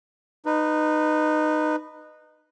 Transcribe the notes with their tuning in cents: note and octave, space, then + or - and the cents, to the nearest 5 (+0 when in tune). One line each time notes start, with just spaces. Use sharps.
D#4 -20 B4 +0